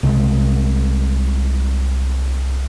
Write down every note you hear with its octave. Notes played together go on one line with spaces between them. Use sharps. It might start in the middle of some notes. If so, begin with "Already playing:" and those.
C2 G#3